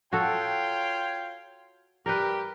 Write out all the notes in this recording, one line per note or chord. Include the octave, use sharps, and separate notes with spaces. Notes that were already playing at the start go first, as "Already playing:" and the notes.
F4 F#4 A4 C#5 G5
G3 G4 A#4 B4